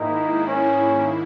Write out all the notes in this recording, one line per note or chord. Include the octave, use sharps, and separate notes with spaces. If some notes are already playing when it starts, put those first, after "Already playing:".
Already playing: G#2 D#3 A#3 D#4 E4
C#4